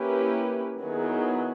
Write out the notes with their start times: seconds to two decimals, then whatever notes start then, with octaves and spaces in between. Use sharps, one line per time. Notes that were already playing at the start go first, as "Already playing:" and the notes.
Already playing: A#3 C#4 E4 G4 B4
0.81 D#3 F#3 B3 E4 G#4